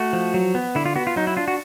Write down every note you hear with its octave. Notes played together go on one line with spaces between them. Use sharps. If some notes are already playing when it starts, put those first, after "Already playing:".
Already playing: A3 F#4
F3
F#3
B3
D3 E4
F4
B3 F#4
F4
F#3 D#4
E4
D4 F4
F#4